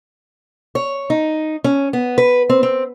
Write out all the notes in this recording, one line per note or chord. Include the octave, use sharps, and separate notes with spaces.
C#5
D#4
C#4
B3
B4
C4
C4